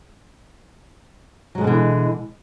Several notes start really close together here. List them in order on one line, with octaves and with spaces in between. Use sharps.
F#3 G#3 B2 D3 E3